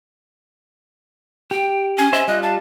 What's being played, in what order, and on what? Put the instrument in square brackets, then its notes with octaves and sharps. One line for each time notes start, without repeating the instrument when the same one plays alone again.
[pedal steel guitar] G4 [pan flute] G5
[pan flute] C#4 [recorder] G#5
[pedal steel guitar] C5 E5 C6 [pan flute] D#5
[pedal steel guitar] G3 F4 [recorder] D#5 [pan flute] F#6
[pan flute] F5 [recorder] A5